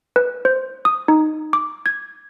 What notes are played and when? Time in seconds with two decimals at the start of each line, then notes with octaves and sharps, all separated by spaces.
0.16 B4
0.45 C5
0.85 D#6
1.08 D#4
1.53 D6
1.86 G#6